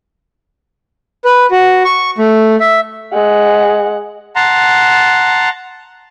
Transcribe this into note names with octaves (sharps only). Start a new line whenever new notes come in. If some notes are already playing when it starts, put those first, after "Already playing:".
B4
F#4
C#6
A3
E5
G#3 F#5
F#5 A5 A#5 C6